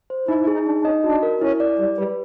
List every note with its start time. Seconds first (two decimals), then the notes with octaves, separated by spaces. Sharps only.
0.10 C5
0.28 D#4 E4
0.40 E4
0.47 G#4
0.53 D#4
0.65 D4 D#4
0.81 D4
0.84 C#4 D#5
1.04 D4 F#4
1.23 A#4
1.41 C#4 E4
1.60 D5
1.79 G3 G4
1.98 G3 B4